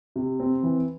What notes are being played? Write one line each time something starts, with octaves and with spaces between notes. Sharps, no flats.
C3
C4
E3